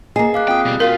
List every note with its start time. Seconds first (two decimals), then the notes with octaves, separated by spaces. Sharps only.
0.16 A#3 G#4 D#5 A#5
0.34 F5 D6 F#6
0.48 C4 F4 G5 D#6
0.65 B2 G3
0.80 F4 F#4 A#4 F5 B6